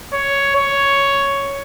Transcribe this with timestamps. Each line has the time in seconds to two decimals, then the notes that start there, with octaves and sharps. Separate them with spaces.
0.13 C#5
0.56 C#5